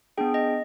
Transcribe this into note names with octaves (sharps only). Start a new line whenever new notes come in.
B3 D4 G#4 G5
D#5